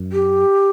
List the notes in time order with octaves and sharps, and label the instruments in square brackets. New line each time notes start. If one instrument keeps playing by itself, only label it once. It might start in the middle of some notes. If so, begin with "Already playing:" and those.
Already playing: [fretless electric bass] F#2
[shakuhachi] G4